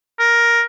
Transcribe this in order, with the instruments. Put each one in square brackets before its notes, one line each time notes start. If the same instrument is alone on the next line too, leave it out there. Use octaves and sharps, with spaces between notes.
[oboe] A#4